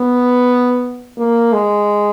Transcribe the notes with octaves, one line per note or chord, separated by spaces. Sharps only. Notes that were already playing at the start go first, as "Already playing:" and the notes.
Already playing: B3
A#3
G#3